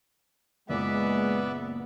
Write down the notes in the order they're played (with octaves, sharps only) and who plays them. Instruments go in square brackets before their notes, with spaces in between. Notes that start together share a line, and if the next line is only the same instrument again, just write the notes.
[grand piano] F#1 A#2 D6 [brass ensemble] G#3 [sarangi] B3 [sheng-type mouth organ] B4 D5 E5